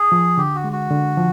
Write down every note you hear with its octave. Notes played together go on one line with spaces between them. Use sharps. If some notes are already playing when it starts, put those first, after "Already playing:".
Already playing: G#4
F3
D3 G4
F#4
G#3
F#4
D3
F3